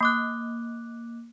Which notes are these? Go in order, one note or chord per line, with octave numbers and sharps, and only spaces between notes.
A#3 D6 F#6